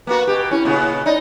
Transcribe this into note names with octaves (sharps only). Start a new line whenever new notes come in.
A#3 B3 F#4 B4
B2 G4
C#4 E4
A#2 C#3 B3
D#4 D5